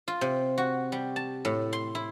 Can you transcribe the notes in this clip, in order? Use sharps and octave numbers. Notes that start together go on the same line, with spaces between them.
F4
C3
F#4
G3
A5
A2
C6
E4